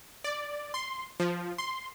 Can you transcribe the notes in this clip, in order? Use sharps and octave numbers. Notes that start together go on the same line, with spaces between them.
D5
C6
F3
C6